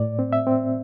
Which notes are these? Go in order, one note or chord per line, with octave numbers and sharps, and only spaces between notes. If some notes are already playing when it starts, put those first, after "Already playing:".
Already playing: A2 D5
C4
E5
C4